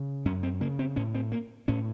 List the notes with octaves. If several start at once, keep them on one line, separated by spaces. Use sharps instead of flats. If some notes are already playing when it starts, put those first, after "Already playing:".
Already playing: C#3
F#2 C#4
C4
C#3 A#3
C4
A2 C#4
C4
A#3
A2 C#4